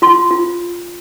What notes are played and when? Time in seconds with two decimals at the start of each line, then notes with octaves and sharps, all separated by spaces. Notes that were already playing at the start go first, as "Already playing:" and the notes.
0.02 F4 C6
0.31 F4